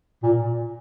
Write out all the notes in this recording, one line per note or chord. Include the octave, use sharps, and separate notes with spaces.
A#2